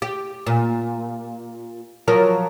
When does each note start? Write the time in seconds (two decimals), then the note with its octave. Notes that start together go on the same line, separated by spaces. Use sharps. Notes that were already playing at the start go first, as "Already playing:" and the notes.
0.02 G4
0.46 A#2
2.08 F3 F#3 A#4